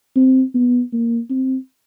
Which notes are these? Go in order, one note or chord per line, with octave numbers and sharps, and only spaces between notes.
C4
B3
A#3
C4